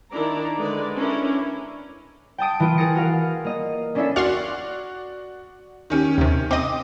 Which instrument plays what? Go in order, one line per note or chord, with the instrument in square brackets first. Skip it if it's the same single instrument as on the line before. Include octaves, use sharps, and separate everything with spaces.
[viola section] D#3 D4 E4 D5 A#5
D3 G#3 B4 D5
C#4 D4 E4 A#4
[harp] G5 A5 D#6 D7
E3 A#3 F4 D7
G#4 A#4 D#6 A6 A#6 C#7
F#4 A#4 F5
A#3 D#5
C#4 D4 E4 A4 C#5 E5
[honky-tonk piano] F#4 D5 [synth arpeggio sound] C6 C#6 F6
[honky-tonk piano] D#3 C#4 G4
[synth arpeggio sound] D#2 C3
[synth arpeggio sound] C4 D#5 [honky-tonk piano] D6 D#6